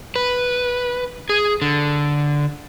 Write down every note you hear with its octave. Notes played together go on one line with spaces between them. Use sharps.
B4
G#4
D3